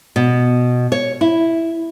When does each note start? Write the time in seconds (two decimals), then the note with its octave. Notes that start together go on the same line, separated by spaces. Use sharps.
0.16 B2
0.92 C#5
1.21 E4